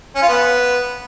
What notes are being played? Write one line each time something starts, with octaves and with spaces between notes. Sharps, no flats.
C#4
F4
B3